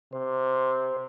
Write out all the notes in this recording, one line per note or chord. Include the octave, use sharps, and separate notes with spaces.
C3 C5